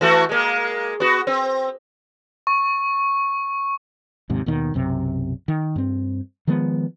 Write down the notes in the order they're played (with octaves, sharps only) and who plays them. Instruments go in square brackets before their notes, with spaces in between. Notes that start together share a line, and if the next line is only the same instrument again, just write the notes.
[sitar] E3 A3 F#4
G#3 A#3
B3 F#4
C4
[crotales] C#6
[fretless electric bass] D#2 G#2 C3
D#2 B2 D#3
B1 F#2 C3
D#3
G2 C4
D#3 F3 G#3 B3